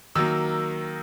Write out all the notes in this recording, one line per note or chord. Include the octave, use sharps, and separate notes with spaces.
D#3 F#3 A#3 E6